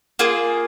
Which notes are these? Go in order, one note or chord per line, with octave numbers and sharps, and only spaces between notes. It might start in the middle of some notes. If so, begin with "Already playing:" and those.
A#3 F4 G#4